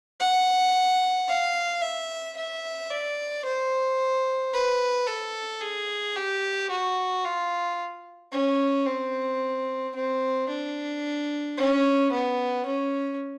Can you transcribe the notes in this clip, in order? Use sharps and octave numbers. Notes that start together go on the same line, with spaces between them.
F#5
F5
E5
E5
D5
C5
B4
A4
G#4
G4
F#4
F4
C#4
C4
C4
D4
C#4
B3
C#4